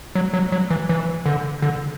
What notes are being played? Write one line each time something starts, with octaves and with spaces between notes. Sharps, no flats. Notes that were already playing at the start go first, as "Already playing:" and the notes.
F#3
F#3
F#3
E3
E3
D3
D3